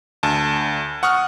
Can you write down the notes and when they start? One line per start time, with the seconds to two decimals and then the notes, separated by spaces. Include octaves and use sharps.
0.23 D2 A5
1.03 F#5 C#6 D#6 F6